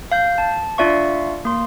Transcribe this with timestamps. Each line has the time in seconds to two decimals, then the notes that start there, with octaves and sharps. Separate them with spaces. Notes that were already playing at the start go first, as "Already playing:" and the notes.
0.11 F5 G6
0.38 A5
0.78 D4 F4 D5 E5 F5 C#6
1.45 A#3 C6